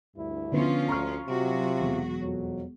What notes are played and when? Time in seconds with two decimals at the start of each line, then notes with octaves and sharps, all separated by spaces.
0.16 D2 G2 E4
0.52 D3 F3 B3 C#4 F4
0.88 D2 A#5 C#6 F6
1.27 C3 F#3 F4 F#4
1.80 E1
2.20 F2 F#3